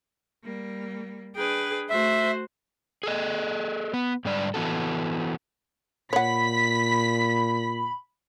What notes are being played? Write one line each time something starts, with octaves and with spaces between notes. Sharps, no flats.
G3 A#3
D4 G#4 B4 G5
A3 F#4 C5 E5
G#4 A4 D#5
B3
G#2 D3 G3 D5
E3 B3 F#4 A4
A#2 C#5 F#5 B5 B6